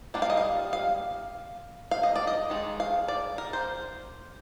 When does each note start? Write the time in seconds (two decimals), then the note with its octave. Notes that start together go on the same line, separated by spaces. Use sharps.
0.14 G3 A#3 D4 F4
0.22 F5
0.30 D#5
0.37 F5
0.73 F5
1.91 F5
2.03 D#5
2.16 D5
2.27 D#5
2.50 D#3 G#3
2.80 F5
3.08 D5
3.38 A#4
3.53 C5